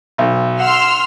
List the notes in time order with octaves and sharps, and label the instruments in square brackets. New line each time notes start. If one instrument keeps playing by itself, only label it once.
[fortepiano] B1
[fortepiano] F#5 [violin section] C6 E6 F6